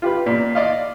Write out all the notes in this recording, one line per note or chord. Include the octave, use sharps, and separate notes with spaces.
F4 G4 B4
A#2
D5 D#5 F5